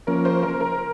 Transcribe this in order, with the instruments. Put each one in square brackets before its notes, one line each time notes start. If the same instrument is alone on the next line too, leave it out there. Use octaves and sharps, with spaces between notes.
[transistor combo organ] F3 A#3 C#4 [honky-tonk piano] A#4
[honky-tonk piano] C5
A#4
A#4